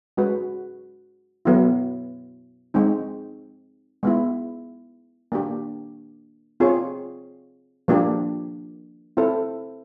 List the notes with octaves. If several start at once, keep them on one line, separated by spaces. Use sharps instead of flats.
G#3 C#4 F#4 B4
F#3 B3 E4
G#3 C4 D#4
G#3 B3 E4
A#3 D4 G4
C4 F4 G#4 C#5
F3 A#3 D4 G4
C4 E4 A4 C5